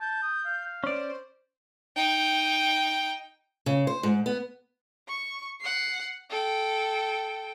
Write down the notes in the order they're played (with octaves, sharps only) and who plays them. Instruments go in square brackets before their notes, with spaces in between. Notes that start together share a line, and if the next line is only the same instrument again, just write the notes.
[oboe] A5 [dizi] G6
[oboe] D#6
F5
[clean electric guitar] C#4 D5 [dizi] C5
[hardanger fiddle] D#4 G5
[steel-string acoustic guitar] C#3
C5
G#2
B3
[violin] C#6
F#5 C7
A4 G5